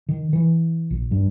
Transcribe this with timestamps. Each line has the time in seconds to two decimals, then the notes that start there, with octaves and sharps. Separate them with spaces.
0.09 D#3
0.33 E3
0.91 A#1
1.11 G2